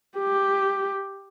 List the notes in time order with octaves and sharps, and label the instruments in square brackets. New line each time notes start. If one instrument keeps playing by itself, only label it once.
[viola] G4